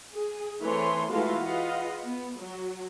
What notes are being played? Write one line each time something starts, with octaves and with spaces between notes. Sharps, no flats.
G#4
E3 A3 C4 C#5 G#5 C6
E3 G#3 A3 F4 F#4 F5
F4 G#4 B4 D#5 F5 F#5
B3
F#3